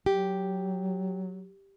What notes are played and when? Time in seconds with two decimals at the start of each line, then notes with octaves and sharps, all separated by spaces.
0.06 F#3 G4